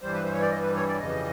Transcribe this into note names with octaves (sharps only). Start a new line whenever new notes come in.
G2 E3 G3 C5
B4
C5
C#5
D5
D#5
B4
C#5
D5
F2 C#3 E3 G3 D#5